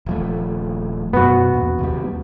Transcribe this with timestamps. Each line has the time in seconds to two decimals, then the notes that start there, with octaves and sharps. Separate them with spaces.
0.06 D#1 F3 A3
1.13 F#2 B2 B3 F#4
1.54 E2 A#2
1.79 D#2 C3 G3